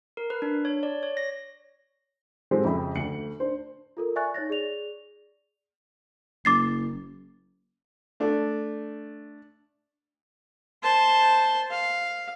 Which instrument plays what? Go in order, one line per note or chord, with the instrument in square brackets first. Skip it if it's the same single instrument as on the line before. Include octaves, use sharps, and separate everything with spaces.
[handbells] A#4
B4
D4
C#5
D5
C#5
A#6
[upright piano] F#3 G#3 C4 G4 A4 C5
F2 C#3 E5 G5 B5
D2 A3 C#7 F#7
D4 C5
[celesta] F4 A4 A#4
D5 E5 G#5 C#6 F#6 A6
D#4 C#5 A6 A#6
G#4 D5 F7
[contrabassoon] F#1 [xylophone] D6 A6 C7
[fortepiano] A3 D4
[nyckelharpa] C5 A5
F5